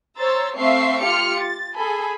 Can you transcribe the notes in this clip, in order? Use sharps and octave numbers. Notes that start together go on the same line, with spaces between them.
C5 C#5 A#5 E6 A6
A3 C4 E5 F5 C#6 C7
F4 G4 F6 C#7
A6
G#4 A4 G#5 B5